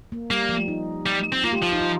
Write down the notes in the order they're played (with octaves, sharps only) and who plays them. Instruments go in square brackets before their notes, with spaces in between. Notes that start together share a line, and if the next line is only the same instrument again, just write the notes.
[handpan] A#3
[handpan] G3 [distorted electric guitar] A#3
[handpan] F3
D#4
[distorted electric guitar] G3
C4
[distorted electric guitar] A#3 [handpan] F4
[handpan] G4
[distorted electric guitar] F3 [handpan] F4
[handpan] D#4
F4